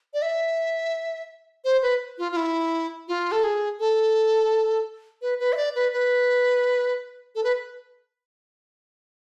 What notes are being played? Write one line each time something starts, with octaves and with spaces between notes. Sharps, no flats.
D5
E5
C5
B4
F4
F4
E4
F4
A4
G#4
A4
B4
B4
E5
D5
B4
B4
A4
B4